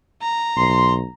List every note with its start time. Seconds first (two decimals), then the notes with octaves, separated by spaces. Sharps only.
0.22 A#5
0.56 B1 C6